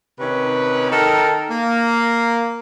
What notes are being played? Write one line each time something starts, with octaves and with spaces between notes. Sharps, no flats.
C3 D#3 C#4 D#4 B4
D#3 D#4 A4 A#4
A#3